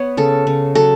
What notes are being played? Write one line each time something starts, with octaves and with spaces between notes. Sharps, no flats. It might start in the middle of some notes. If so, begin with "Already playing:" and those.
Already playing: B3 C#5
C#3 A4
C#3
F#3 A4